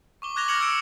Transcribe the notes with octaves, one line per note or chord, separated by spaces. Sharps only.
C#6 D6 G7
D6 F#6 G#6 A#6 F7 G7
F6 G#6 A#6 C#7 F7 F#7
E6 G#6 C#7 D7 E7 F#7